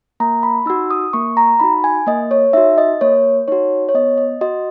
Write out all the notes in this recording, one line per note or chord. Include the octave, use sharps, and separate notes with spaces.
A#3 A#5
B5
D#4 F#4 E6
D#6
A#3 C#6
A#5
D#4 F#4 B5
G#5
A#3 D#5
C#5
D#4 F#4 E5
D#5
A#3 C#5
D#4 F#4 C#5
C#5
B3 D#5
D#5
F#4 D#5